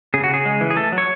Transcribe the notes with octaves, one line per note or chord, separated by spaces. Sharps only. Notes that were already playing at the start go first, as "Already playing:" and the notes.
C#3 G#4
F#4
C#3 G#4
G#3
E3
G#4
A3 A4
F#3
C#5